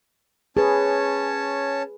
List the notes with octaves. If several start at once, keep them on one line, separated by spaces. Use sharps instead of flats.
C#4 G#4 B4 C#5 A5